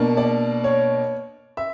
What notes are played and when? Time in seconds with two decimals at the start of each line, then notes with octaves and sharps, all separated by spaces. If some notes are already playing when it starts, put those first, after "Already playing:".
Already playing: B2 A#3 D4
0.17 D5
0.64 C#5
1.57 E5